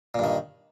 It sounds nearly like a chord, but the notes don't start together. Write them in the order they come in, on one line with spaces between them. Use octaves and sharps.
A#2 G2 D#3